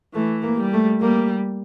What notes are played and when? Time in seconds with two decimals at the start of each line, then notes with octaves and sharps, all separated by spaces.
0.14 E3 A3
0.42 A#3
0.58 G3
0.73 A3
1.01 G3 A#3